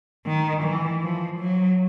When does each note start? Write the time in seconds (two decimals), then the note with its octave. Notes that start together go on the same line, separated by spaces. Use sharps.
0.26 D#3
0.63 E3
1.02 F3
1.40 F#3